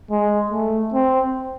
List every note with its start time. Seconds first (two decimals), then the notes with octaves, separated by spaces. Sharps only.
0.11 G#3
0.52 A3
0.94 C4